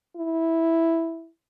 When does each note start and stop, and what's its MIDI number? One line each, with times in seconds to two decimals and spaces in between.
0.17 1.28 64